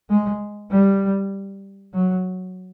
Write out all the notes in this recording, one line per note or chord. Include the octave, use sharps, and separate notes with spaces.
G#3
G3
F#3